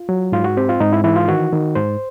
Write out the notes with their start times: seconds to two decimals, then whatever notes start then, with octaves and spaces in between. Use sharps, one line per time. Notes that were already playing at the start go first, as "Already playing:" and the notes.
Already playing: F4
0.09 F#3
0.32 G#2 F4
0.44 F#4
0.57 C4 G4
0.69 F4
0.80 G#2 D#4
0.93 E4
1.04 E3 E4
1.16 F4
1.28 D#3 F#4
1.53 D#3
1.75 G#2 C5